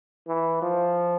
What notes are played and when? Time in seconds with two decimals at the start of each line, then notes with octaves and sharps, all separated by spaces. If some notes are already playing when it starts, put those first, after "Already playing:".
0.27 E3
0.62 F3